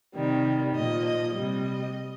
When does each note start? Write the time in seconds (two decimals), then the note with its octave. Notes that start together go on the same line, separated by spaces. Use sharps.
0.15 C3 D#3 G3
0.75 A#2 F3 D#5
1.05 D#5
1.35 C3 G3 D#5